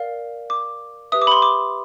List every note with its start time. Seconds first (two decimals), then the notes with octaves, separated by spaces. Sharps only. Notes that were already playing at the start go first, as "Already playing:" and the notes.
Already playing: A#4 D5 F5
0.50 D6
1.12 G4 B4 E5 D#6
1.22 D6
1.27 B5
1.32 C6
1.42 D6